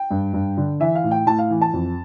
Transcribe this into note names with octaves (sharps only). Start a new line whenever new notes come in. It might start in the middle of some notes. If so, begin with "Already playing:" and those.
Already playing: G5
G2
G2
D3
E3 E5
F5
A2
G5
A2 A5
F5
E3
A5
F2